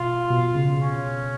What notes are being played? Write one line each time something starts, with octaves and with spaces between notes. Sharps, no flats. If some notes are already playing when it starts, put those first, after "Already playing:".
Already playing: B2 F4
B2
C#3
C#4